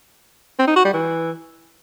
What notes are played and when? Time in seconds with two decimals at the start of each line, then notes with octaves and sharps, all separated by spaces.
0.59 C4
0.67 D#4
0.76 F#4
0.85 G3
0.94 E3